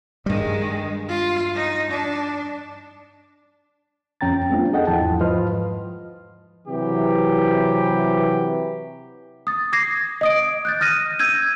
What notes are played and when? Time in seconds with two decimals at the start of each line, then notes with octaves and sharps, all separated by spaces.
0.26 G2 D#3 G3 G#3
1.09 F4
1.55 D#4
1.90 D4
4.21 F2 C#4 G5 A#5 A6
4.49 G3 A3 B3 C4 D4 F4
4.73 G#4 A4 D#5 F#5 G5
4.87 E2 G#2 F3 E4 A5
5.21 G#2 F3 B4 D#5 C6 F6
6.67 C3 E3 F#3 G4
9.47 D#6 A6
9.73 D6 G#6 A#6 C7
10.21 D#5 D#6 D7
10.65 F#6 G6 A6
10.81 D#6 F6 A#6 D#7
11.19 E6 G6 G#6 D#7